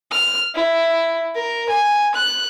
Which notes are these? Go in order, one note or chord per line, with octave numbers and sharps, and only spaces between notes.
F6
E4
A#4
G#5
F#6